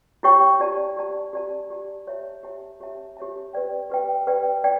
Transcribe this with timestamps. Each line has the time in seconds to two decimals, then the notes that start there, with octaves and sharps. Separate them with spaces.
0.23 E4 G4 C#5 G5 C#6
0.60 G4 D5 A5
0.97 G4 D5 A5
1.33 G4 D5 A5
1.70 G4 D5 A5
2.07 G4 C#5 E5 A5
2.43 G4 C#5 E5 A5
2.81 G4 C#5 E5 A5
3.17 G4 C#5 E5 A5
3.53 G4 B4 D5 G5
3.90 G4 B4 D5 G5
4.27 G4 B4 D5 G5
4.64 D5 G5